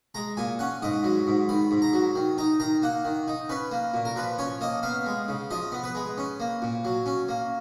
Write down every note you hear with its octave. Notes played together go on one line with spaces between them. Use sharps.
G#3 A#5
A#2 G#5
C#4 F#5
G#2 D#5
F#3
G#2
D#3 B5
G#2
A#5
F#3
D#3
D#4 A#5
D#3 A#5
A#3 F#5
D#3
D#4
C#4 B4
A#3
A#2
A#4
F3 B4
C#4 C#5
A#3 D#5
B3 F5
G#3
C#3
F3 D#5
B3
B4
G#3
C#4
A#3
A#2
F#3
C#4
A#3